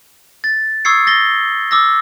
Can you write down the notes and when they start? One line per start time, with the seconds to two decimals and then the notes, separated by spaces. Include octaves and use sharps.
0.44 A6
0.85 C#6 D#6 E6 G#6 C7 C#7
1.07 A6 A#6 G7
1.71 D6 E6 A#6